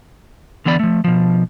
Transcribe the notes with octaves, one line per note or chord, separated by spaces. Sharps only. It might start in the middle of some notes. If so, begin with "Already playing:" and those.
D3 E3 B3 E4 D5 B5
F3 A3
B2 F3